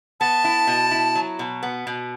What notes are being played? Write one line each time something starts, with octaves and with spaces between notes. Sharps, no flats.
B3 A5
E4
B2
E4
F#3
B2
B3
B2